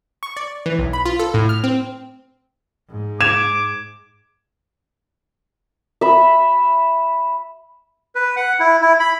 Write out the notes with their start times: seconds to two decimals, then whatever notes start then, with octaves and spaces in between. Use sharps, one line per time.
0.23 C#6
0.37 D5
0.66 E3
0.79 B1
0.93 B5
1.06 F4
1.20 A4
1.34 A2
1.49 F6
1.64 C4
2.89 G#2
3.21 D6 G#6 E7
6.01 E5 B5
8.15 B4
8.37 F#5
8.60 E4
8.82 E4
9.00 B5